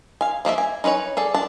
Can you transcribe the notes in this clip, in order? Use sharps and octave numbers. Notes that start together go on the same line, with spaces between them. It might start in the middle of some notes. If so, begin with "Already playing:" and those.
F5 G#5
F3 A#3 D4 E5
G#5
D#4 F4 B4 C#5 G#5
G#4 A4 D5
D4 A5